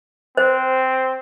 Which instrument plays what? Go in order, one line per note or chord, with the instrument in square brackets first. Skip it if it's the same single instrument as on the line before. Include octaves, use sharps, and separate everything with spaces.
[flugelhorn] C4 [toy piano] C5